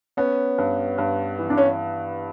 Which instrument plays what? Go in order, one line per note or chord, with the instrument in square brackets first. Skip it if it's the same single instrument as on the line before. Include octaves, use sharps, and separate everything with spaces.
[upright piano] B3 [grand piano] C#4
[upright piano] G2
G2
E3
[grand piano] D4
C#4